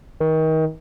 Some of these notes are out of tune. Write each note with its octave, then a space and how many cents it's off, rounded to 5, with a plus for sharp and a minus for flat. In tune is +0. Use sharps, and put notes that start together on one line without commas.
D#3 +30